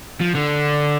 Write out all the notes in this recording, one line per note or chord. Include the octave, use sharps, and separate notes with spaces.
F3
D3